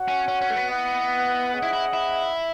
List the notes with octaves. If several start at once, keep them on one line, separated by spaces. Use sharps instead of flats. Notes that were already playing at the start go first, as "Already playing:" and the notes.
Already playing: F#4 C#5 F#5
C#4
C#4
C#4
A3
B3
E4 B4 D#5 F#5
C#4 G#4 D#5 F#5
E4
E4
E4